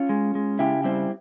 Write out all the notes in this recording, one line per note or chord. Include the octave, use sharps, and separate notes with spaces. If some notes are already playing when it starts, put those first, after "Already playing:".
Already playing: C#4 F4
G#3
G#3
C#3 E4 G4
G3 C4 E4